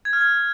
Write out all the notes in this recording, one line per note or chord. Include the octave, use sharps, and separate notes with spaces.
G#6
F6
G#6